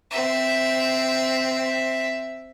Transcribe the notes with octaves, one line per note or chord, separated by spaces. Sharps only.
C4 E5